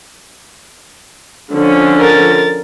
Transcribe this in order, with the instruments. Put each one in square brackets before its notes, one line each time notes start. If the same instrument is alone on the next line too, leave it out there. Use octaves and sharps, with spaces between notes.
[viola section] D3 F3 C#4
[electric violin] A#4 A6